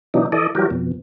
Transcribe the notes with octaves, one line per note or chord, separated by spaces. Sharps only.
B2 E3 F#3 D4 D#4
E3 A4 D5 D#5
E3 F#3 G3 F#4 G4 A#4
F2 B2